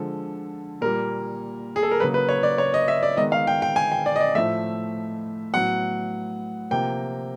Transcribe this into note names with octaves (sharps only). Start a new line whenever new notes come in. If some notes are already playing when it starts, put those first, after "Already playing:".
Already playing: D3 F3 G#3 A4
A#2 G3 A#3 A#4
G#4
A4
A#4
C#3 F#3 A#3 B4
B4
C#5
D5
C#5
D#5
E5
D5
D#3 G#3 B3 D#5
F5
G5
G5
G#5
G5
D5
D#5
D5
A2 F3 A3 E5
A2 F#3 B3 F#5
C3 F3 A#3 G5